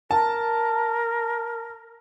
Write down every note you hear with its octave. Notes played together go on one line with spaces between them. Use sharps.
A#4 A5